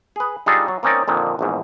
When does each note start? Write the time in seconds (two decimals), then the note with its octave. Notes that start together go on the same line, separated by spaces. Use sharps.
0.16 G#4 B4
0.46 G3 D4 D#4 F4 G#4 A4
0.68 F#3
0.83 A#3 C4 C#4 D#4 A#4 D5
1.08 F2 A#2 D3 D#3
1.39 A#1 E2 G#2